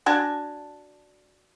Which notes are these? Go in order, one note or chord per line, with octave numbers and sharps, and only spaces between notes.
D4 F#4 G#5 A5